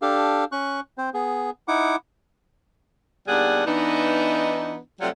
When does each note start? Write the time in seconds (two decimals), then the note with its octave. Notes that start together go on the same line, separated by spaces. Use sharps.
0.02 D4 G4 A4 F5
0.52 C#4 C#6 F#6
0.98 C4 C5
1.14 B3 G#4
1.68 D#4 E4 F#5 D6
3.28 D#2 B2 G3 D4 G#4 F#5
3.66 E3 B3 D4 D#4
5.01 C3 F#3 G3 A3 F4